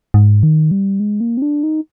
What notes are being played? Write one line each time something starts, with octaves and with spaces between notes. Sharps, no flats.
G#2
D#3
G3
G#3
A#3
C4
D4
D#4